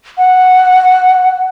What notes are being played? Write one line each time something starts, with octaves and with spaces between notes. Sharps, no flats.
F#5